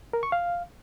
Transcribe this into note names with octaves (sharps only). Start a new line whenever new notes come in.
A#4
C#6
F5